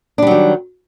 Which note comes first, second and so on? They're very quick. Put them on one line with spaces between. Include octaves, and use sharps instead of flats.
D4 G3 F#3 D#3